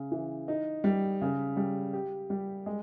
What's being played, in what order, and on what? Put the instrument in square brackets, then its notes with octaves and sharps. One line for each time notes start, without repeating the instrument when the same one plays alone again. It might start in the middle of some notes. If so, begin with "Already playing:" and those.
Already playing: [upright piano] C#3
E3
D#4
G3
C#3
G3
G4
G3
G#3